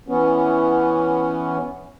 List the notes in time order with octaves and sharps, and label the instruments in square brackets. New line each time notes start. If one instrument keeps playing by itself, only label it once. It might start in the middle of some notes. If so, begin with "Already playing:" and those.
[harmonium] E3 B3 C#4